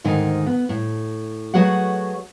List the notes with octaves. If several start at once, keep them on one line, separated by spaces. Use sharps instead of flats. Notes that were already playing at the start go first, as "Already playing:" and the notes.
D2 G#2 D#3 D#4 G#5
B3
A2
F#3 A3 F#4 G#4 B4 F#5